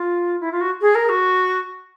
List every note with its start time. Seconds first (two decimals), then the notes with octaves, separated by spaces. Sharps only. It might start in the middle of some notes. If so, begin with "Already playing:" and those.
Already playing: F4
0.40 E4
0.51 F4
0.61 F#4
0.81 G#4
0.95 A#4
1.09 F#4